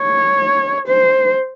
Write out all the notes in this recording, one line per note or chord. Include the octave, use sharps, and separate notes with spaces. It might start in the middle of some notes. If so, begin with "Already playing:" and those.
Already playing: C#5
C5